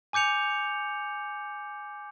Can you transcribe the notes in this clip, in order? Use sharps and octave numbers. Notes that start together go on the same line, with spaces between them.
G#5 D6 G6 C#7 F7